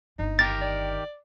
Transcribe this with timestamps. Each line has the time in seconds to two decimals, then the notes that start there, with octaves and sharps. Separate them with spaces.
0.19 G1 D4 D#4
0.39 D#3 G4 A#4 A6
0.61 D5